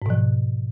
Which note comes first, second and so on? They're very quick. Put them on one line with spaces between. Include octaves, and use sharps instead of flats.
G#2 B2 F3